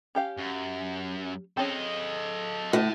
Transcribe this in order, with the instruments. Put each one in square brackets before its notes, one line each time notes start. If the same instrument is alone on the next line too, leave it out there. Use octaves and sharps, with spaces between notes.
[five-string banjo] C#4 G4 F5
[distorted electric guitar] F#2
[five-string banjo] C4 C#4 G#4 [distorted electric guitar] A4 D#5
[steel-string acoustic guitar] A2 [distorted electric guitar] F#5 A5